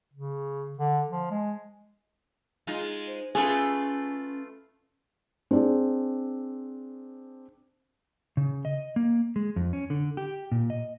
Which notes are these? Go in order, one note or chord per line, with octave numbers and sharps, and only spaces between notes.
C#3
D3
F3
G#3
G#3 D#4 F4
C5
A3 C#4 F4 G#4 B4
C4 D4 G#4
C#3
D#5
A#3
G#3
F2
C#4
D3
G4
A#2
D#5